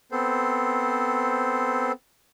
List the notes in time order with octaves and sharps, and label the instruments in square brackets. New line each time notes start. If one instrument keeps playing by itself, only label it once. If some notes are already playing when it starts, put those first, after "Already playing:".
[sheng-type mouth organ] B3 C4 A4 C5